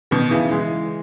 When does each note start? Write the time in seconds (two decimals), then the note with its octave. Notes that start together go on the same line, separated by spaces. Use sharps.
0.11 B2 D#3
0.31 C#3 E3
0.51 E3 G#3